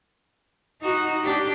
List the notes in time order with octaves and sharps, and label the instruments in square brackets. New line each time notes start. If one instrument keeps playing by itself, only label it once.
[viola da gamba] D#4 F#4
D4 G4